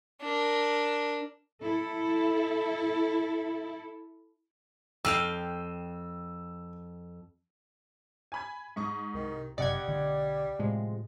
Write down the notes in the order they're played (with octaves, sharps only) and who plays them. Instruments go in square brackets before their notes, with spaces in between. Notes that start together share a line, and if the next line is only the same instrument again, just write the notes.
[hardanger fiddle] D4 A#4
[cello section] E4 A4
[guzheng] F2 F5 G5 [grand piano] E6
[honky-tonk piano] G#5 B5 G#6
G#2 C#6 D#6
[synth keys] C2 [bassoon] D#3
[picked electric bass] G1 F#2 C3 [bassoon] G3 [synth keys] D5 G#6 [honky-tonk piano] D#5 F#5
[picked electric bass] B1 D3
[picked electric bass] A2 [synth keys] C3 F3 G#3